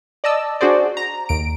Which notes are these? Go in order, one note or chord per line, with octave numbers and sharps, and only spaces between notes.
D5 D#5 A5 E6
D4 F#4 G#4 C5 D5
A#5
D#2 D7